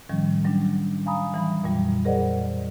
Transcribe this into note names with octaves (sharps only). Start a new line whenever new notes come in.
A2 D#3 F3 G3 C#4
F#3 G3 C#4 D4
F5 G#5 A#5 B5 D#6
E3 G3 B5
F2 A#2 F#3 G3
G#4 A#4 C5 D5 D#5 F#5